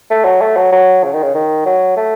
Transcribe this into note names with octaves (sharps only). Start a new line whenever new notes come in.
A3
F#3
A3
F#3
F#3
C#3
D#3
C#3
D#3
F#3
A3